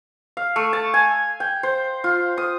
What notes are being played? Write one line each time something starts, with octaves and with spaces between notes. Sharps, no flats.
F5
A3
A5
G#5
G5
C5
F4
D#6